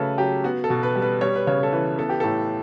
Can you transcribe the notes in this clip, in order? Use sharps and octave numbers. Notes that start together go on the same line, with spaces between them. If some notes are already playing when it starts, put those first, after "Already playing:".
Already playing: C#3 F#3 A3 A4 B4
F#3 G4
B3 F#4
A4
B2
B4
G3
B4
G3 C#5
B4
C#3 C#5
A4
E3 B4
B3 A4
G4
A2 A4